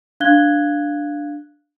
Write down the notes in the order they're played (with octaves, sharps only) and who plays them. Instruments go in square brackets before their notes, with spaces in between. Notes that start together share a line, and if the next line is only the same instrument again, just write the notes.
[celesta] D4 F5 F#6 G#6 G7